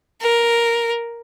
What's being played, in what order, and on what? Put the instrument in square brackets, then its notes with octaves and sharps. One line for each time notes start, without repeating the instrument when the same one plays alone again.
[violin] A#4